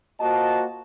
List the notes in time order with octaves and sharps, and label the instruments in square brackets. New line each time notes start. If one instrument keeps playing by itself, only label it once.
[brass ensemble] A#3 F4 F#4 C5 D#5 A5